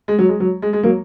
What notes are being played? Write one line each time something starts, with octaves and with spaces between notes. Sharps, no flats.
G#3
F#3
G#3
F#3
G#3
G#3
F#3 A#3